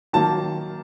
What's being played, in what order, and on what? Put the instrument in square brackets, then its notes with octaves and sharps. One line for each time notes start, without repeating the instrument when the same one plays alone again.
[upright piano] D#3 F#3 A#3 A5